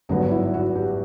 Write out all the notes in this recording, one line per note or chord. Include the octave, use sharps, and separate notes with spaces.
G#1 G2 D3 F#3 B3 D#4
E4
F#4
G4